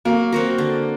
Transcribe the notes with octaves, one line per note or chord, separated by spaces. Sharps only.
F#3 A#3
C4 F#4 A#4
D3